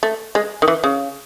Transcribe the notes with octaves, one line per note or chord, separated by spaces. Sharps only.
A3
G#3
D#3
E3
C#3